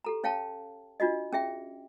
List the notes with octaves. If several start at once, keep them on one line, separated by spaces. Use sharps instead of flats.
G4 A4 A#5
C#4 C#5 F5 G5 A5
D4 F4 F#4 D#5
C#4 G#4 E5 G5